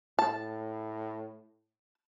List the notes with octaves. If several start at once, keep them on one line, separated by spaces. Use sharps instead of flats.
A2 A5